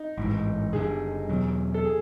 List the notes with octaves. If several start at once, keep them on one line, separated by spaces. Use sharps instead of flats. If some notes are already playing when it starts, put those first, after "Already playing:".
Already playing: D#4
A1 G#2 E3
F#1 F#2 D3 G3 G#4
E2 B2 F#3
A4
G#4